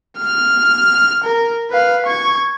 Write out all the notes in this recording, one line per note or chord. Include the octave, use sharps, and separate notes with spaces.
F6
A#4
B4 F5
C#6 G#6